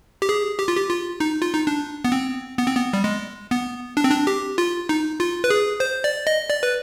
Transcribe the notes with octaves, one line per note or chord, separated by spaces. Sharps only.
G4
G#4
G4
F4
G4
F4
D#4
F4
D#4
D4
B3
C4
B3
C4
B3
G3
G#3
B3
D4
C4
D4
G4
F4
D#4
F4
B4
G#4
C5
D5
D#5
D5
B4